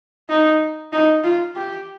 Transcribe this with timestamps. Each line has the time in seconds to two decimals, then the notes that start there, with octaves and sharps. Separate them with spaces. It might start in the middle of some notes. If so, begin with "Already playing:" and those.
0.29 D#4
0.92 D#4
1.24 F4
1.56 G4